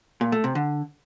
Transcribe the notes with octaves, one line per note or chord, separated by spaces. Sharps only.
A#2
A3
C3
D3